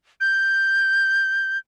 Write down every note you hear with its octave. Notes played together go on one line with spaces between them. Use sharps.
G6